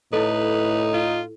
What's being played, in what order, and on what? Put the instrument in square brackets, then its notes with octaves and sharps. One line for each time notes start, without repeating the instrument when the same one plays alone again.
[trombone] A2 [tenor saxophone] D#4 [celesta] E4 A4 [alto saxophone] B4
[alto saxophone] F4